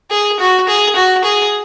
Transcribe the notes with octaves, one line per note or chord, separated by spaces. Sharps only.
G#4
F#4
G#4
F#4
G#4